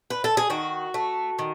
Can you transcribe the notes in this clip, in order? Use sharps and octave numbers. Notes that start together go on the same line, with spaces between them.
B4
A4
G#4
D#3 F#4
A3
D#3